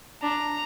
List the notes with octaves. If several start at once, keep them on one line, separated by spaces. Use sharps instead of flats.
D4 A#5